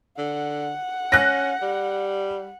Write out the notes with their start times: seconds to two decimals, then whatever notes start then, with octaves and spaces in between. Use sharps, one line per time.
0.18 D3 F#5
1.12 C#4 F#6 A#6
1.62 G3